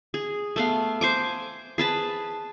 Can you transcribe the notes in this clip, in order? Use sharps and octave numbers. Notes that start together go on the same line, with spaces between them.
G#4
A3 B3 F5
C5 G#5 D6
G#4 B4 A5